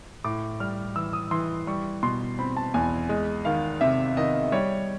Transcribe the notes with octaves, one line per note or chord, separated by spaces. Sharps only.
A2 D6
G3 F6
E3 E6
D#6
E3 C6
G3 C#6
B2 C6
C4 B5
A5
E2 G#5
G#3
D#3 F5
C3 E5
D#3 D#5
G3 C#5